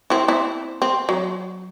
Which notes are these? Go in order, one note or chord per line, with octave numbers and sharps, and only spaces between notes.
C4 E4
C4 E4
C4
F#3